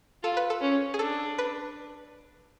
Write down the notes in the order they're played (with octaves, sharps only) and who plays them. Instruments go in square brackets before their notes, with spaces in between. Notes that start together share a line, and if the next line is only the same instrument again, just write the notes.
[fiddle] F4 [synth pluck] A4
[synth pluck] B4
A4
[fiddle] C#4
[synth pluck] G#4
[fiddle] D4 [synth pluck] A4
[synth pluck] B4